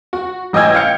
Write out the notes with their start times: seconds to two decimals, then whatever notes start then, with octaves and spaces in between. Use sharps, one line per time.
0.13 F#4
0.53 A1 D#5 G5 G#5 E6 G#6
0.74 F5 G5 F6 C#7